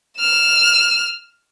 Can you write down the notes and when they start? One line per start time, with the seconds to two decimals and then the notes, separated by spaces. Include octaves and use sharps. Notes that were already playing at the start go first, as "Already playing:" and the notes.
0.18 F6 E7